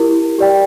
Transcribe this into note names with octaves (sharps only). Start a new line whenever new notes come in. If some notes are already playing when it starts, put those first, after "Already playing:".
Already playing: E4 G4 A#4
G4 D5 G5